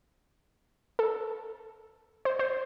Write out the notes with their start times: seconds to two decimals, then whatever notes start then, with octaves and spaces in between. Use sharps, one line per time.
0.99 A4
2.25 C5
2.39 C5